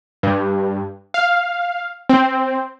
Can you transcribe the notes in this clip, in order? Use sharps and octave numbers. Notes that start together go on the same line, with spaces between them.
G2
F5
C4